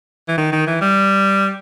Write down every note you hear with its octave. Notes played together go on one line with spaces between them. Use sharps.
E3
D#3
D#3
E3
G3